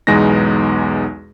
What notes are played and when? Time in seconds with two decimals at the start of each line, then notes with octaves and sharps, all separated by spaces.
0.07 B1 E2 G#3 B3 D#4 A#6